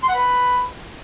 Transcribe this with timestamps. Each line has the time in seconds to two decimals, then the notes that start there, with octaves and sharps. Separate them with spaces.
0.03 C6
0.09 F#5
0.15 B4